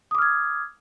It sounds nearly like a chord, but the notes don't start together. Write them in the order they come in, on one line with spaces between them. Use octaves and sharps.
D#6 D6 F6 G#6